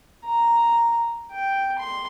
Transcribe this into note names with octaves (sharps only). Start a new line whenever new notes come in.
A#5
G5
C6